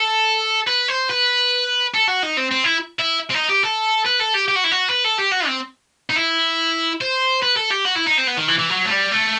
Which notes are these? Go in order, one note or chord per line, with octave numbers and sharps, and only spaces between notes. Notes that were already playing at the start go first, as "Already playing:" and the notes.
Already playing: A4
B4
C5
B4
A4
F#4
D#4
C4
C4
E4
E4
C4
D#4
G4
A4
B4
A4
G4
G4
F#4
E4
F#4
B4
A4
G4
F#4
C4
D#4
E4
C5
B4
A4
G4
F#4
E4
D#4
C4
B3
D#3
E3
E3
F#3
A3
G3
A3